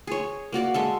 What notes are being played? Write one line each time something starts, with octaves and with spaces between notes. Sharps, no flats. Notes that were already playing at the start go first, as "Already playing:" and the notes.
G#4 C#5
A#3 F#4 D5 F#5
G#3 A4 E5